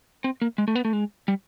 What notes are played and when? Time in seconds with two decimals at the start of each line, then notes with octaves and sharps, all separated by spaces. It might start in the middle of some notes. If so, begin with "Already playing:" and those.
0.24 C4
0.42 A#3
0.58 G#3
0.68 A3
0.76 B3
0.85 A3
0.93 G#3
1.28 G3